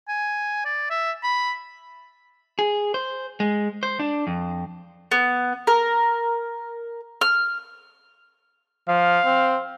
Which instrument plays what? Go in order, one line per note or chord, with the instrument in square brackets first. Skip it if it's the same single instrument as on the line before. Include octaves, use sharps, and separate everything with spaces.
[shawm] G#5
D5
E5
B5
[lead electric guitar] G#4
C5
G#3
C5
D4
F2
[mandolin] B3
A#4
F6
[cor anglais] F3 [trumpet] F5
[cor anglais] C4